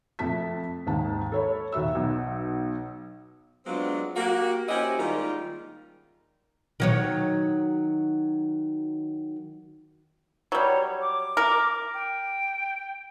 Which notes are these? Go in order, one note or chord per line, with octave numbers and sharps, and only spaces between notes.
F2 A3 E5 A5 B6
D#2 G#2 A5
A4 C#5 B5
D#2 F#4 E5 E6
B1
F#3 G#3 B3 C4 D4 F4
A#3 F#4 G4
C#4 E4 F#4 G4 C5 D#5
D#3 G3 G#3 A#3 F4 A#4
D#3 F#3 C#5
F#3 G3 C#5
D6
A#4
G5